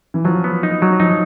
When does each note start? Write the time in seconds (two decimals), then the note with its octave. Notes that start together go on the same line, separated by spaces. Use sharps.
0.14 E3
0.24 F3 F#3
0.44 B3
0.63 D#4
0.82 F#3
1.00 F3 D#4